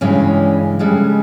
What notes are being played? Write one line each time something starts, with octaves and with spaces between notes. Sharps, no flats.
G2 C#3 E3 G#3 C#4
F2 C#3 G3 G#3